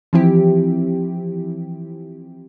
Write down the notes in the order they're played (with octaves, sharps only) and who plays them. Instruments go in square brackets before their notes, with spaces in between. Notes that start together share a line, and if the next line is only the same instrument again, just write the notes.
[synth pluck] E3 F3 C4 E4 G4